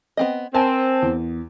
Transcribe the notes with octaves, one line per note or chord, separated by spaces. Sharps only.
B3 C4 D#5
C4 A#4 G#5 A5
E2